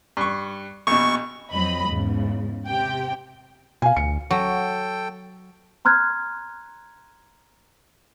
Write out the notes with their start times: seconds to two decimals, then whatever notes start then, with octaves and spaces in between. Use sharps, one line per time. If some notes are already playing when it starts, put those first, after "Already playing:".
0.17 G2 C#6
0.87 A#1 B2 C#6
1.51 F2 F#3 C4 D#5 B5
1.86 E2 G#2 C#3
2.68 C3 G4 G5
3.82 B2 F5 G#5
3.96 D2 C#7
4.31 F#3 A4 G5
5.85 A#5 C6 F6 F#6 G#6